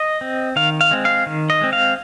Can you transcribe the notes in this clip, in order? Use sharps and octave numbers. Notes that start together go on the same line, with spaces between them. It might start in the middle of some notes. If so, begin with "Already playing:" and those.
Already playing: D#5
C4
D#3 F5
F5
G#3 C4
F5
D#3
D#5
G#3 C4
F5